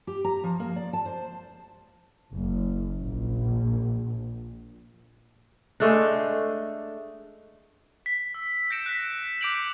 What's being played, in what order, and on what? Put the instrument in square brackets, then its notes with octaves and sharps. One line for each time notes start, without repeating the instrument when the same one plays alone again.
[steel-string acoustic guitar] G4
A#5
F3
A#3
D5
A5
C5
[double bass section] F#1
A#1
[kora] G#3 A3 D4
[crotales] B6
E6
G6 A#6 B6 C#7 D7 E7
F#6 B6
D6 G6 D7 F7 F#7